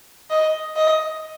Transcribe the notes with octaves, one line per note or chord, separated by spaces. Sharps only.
D#5
D#5